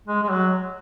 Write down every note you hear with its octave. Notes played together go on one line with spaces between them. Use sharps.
G#3
G#3
F#3